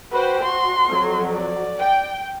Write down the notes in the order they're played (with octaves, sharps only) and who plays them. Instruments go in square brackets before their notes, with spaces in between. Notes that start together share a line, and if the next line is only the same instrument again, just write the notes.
[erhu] F#4 [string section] B4 C5 G5
[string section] F#4 [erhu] C6
[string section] F2 F#3
[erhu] D5
[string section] G5